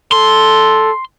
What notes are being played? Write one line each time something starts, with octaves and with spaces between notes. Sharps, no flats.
A4 C6